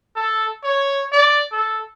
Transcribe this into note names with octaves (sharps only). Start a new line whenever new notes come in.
A4
C#5
D5
A4